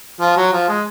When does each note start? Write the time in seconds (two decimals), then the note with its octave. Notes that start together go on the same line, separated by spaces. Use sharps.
0.21 F3
0.37 F#3
0.53 F3
0.69 G#3